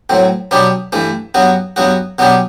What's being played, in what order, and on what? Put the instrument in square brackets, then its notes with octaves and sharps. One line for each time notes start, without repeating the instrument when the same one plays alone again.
[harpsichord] A2 F#3 C4
B2 F#3 B3 D4 G4
G2 E3 A3
G2 F#3 B3 F#4
G2 F#3 B3 F#4
B2 F#3 B3 D4 G4